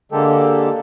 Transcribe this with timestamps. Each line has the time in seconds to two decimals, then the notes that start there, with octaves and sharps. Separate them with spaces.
0.12 D3 G#3 A#3 G4 A4